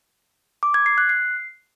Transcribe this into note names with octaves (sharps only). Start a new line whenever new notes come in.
D6
G#6
C7
F#6
C7